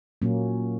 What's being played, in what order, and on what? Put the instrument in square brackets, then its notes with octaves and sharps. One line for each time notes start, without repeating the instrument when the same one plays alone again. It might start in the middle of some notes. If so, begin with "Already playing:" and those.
[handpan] A#2 F#3 A#3 C#4